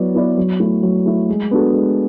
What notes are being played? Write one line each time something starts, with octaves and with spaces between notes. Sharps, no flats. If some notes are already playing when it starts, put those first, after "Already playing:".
Already playing: F#3 B3 E4 B4 D5
B3 E4 B4 D5
F#3
A3 E4
F#3
A3 E4
G#3
B3 D4 F#4 A4
G#3